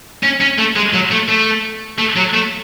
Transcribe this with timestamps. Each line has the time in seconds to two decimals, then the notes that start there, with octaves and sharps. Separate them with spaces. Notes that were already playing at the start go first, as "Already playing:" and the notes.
0.23 C#4
0.41 C#4
0.58 A3
0.76 G#3
0.93 F#3
1.11 A3
1.28 A3
1.98 A3
2.16 F#3
2.33 A3